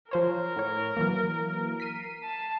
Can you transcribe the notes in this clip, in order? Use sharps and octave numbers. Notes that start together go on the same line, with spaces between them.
F3 A#4 C5 C#5
A2 C#5
E3 F#3 A#3
B6 C7 D#7
A5